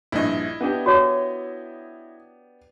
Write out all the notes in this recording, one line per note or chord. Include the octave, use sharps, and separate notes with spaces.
A#1 G2 E4 D#5
B3 D4 G4
F#4 C#5 D6